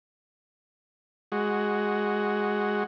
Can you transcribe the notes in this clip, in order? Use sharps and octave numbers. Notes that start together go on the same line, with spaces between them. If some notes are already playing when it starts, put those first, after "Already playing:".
G#3 F#4